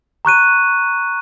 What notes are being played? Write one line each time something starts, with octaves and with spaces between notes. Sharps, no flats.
A#5 C#6 F#6 D#7